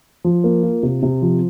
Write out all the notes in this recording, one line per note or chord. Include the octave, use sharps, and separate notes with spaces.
F3
A#3
F4
C3
C3
F3